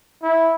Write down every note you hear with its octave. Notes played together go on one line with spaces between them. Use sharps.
E4